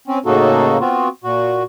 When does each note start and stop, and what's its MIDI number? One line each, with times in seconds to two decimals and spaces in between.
0.08 0.19 60
0.08 0.19 61
0.26 0.78 45
0.26 0.78 49
0.26 0.78 58
0.26 0.78 63
0.26 0.78 66
0.26 0.78 69
0.80 1.08 59
0.80 1.08 60
0.80 1.08 65
0.80 1.08 66
1.24 1.63 46
1.24 1.63 66